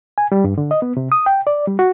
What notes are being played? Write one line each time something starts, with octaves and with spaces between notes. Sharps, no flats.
G#5
G3
G2
D3
D#5
B3
C3
D#6
G5
D5
G3
F#4